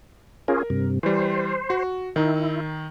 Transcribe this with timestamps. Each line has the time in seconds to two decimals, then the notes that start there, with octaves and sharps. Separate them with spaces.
0.48 C#4 F4 G#4 A#4
0.70 G2 C3
1.03 E3 G3 C5
1.70 F#4
2.16 D#3 D#4 E4